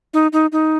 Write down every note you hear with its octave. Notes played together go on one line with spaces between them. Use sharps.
D#4
D#4
D#4